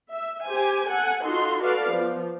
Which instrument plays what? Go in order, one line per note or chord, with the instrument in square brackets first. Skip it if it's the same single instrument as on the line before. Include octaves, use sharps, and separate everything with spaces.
[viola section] E5
G4 C5 G#5
A4 F#5 G#5
D#4 F4 F#4 A4 C6
F#4 A4 B4 D5 F5
F3 B3